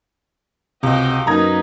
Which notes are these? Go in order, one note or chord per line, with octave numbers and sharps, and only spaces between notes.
C#2 C3 F#4 G4 D#5
F#2 A#3 D#4 B4 A#5 D#6 G#6